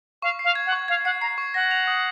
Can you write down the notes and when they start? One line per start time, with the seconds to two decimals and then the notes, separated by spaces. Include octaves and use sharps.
0.22 F5 C#6
0.39 C7
0.45 F5
0.55 G#6
0.66 F#5
0.72 C#6
0.88 F5 G#6
1.05 F#5 C7
1.21 A#5 C7
1.38 C#6
1.54 F#5 A#6
1.71 F7
1.87 D#6